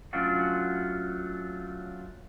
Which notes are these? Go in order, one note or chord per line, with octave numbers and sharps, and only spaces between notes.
F#3 A3 C#4 D4 F4 F#4